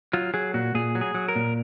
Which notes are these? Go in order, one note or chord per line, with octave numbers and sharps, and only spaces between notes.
F#3 F4
F#3 G#4
A#2 F#4
A#2 G#4
F#3
G#4
F#3
A#4
A#2